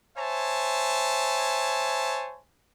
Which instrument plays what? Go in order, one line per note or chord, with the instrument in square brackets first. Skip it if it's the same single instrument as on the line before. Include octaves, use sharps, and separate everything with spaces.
[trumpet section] C5 C#5 E5 G#5 A5